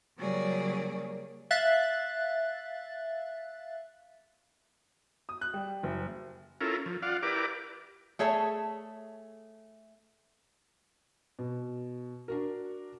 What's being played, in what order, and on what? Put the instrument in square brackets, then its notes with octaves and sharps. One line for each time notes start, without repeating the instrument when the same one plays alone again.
[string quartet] C#3 F#3 G3 A#3 G#4 D5
[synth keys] E5 F5 F#6 A6
[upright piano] D#6
F#6
G3
F#1
[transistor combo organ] C#4 E4 F4 A4 A#4
F3
F4 D5 F5 F#5
E4 G4 A#4 B4 D5 D6
[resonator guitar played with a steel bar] A3 G#4 C#5 E5 A5
[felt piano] B2
D4 F#4 A#4